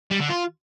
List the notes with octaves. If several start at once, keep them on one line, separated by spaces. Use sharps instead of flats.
G3
D3
F4